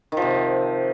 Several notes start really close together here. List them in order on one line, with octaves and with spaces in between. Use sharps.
D#3 F3 C3